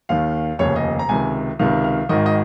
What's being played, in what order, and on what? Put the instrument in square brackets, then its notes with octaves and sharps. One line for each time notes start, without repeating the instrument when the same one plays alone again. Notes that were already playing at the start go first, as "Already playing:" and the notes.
[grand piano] D#2 D#3 F5
F1 D#2 C#3 C#5
D#5
A#5
C#2 C3 D#3 G#5
C#2 C3 D#3 F5
F5
G#1 G#2 D#3 D#5
D#5